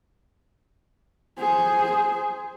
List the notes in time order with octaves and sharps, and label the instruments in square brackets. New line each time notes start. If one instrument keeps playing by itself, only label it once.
[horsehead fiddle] G#4 C5